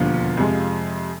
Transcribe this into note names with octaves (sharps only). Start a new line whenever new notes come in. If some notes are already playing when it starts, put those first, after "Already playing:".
Already playing: E1 D#2 D3 F3 F4
F2 C3 F3 G#3